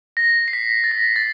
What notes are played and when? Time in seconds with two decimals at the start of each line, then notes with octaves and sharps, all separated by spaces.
0.17 A#6
0.48 C7
0.53 B6
0.84 A6
0.91 A#6
1.16 A6